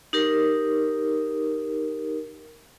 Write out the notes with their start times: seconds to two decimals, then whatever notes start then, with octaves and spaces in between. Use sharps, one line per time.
0.13 D#4 G4 A#4